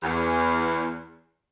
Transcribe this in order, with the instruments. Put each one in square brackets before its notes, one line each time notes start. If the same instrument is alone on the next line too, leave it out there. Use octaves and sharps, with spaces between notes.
[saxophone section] E2